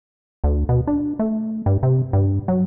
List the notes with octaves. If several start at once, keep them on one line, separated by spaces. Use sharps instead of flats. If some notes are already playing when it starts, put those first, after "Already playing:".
D2
B2
D4
A3
G2
C3
G2
F#3